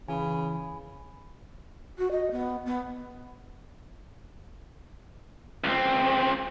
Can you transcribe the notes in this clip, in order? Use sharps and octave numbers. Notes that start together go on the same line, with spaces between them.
C#3 E3 G#5 B5
F#4
D#5
B3
B3
C#2 C4